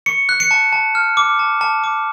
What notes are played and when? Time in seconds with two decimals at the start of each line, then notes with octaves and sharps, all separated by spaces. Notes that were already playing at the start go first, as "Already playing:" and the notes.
0.06 C#6 C#7
0.29 F#6
0.40 C#7
0.51 A5
0.73 A5
0.95 F6
1.17 D6
1.39 A5
1.61 A5
1.84 D6